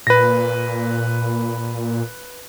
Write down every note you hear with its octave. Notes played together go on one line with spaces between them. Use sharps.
A#2 B4 A#6